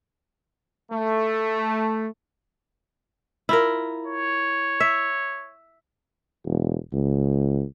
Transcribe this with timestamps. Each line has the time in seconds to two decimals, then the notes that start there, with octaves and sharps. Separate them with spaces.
0.92 A3
3.49 E4 F4 A#4
4.07 C#5
4.80 E5
6.45 E1
6.93 C#2